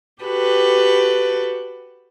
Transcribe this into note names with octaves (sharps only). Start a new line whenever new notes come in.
F#4 G4 A4 B4